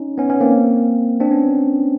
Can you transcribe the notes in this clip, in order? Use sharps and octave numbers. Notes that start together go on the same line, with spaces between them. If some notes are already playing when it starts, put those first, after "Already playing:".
Already playing: C#4 D#4
B3 C#4
B3 C#4
A#3 C4
C4 D4
B3 C#4